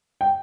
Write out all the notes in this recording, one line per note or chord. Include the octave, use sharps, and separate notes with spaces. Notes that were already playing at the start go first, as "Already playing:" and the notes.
G5